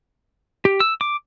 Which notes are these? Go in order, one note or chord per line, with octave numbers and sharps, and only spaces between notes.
G4
E6
D6